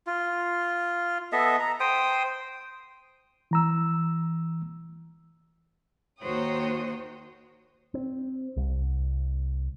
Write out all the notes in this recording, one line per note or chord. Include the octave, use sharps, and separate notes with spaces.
F4
B3 A4 D#5 E5
A#5
C5 G5 D#6
E3 A#5 E6
D#2 F#4 C5 C#5 G5 D#6
C4
C2